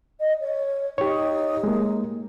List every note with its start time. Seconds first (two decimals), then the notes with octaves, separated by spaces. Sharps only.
0.20 D#5
0.40 C#5
0.98 D#4 G4 C#5
1.64 G#3 A#3